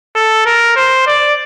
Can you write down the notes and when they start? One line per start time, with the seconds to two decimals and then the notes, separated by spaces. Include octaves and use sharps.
0.15 A4
0.45 A#4
0.76 C5
1.06 D5